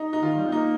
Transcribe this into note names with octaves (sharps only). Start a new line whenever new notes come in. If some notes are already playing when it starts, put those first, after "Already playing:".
Already playing: D#4
D#4
D#3 F4
G3
C4
A#3 D#4